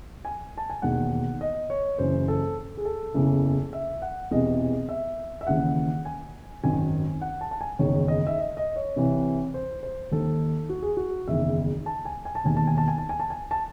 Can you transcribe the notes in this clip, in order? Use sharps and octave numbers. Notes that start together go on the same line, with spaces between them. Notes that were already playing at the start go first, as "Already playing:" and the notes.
G#5
A5
G#5
E1 D#2 D#3 F#5
D#5
C#5
F#1 F#2 E3 C5
A4
G#4
A4
F#1 E2 C#3 E3
E5
F#5
E1 E2 C3 E3 D#5
E5
E5
D#2 C#3 E3 F#5
G#5
G#1 F#2 D#3 G#5
F#5
A5
A5
G#5
F#1 E2 D#3 C#5
D#5
E5
D#5
D#5
C#5
C2 C3 E3
C5
C5
D#2 D#3 A4
F#4
G#4
F#4
F#1 E2 D#3 E5
A5
G#5
G#5
A5
E1 D#2 D#3 G#5
A5
G#5
A5
G#5
A5
G#5
A5
G#5
A5